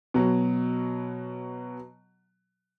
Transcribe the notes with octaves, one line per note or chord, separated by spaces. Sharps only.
B2 F#3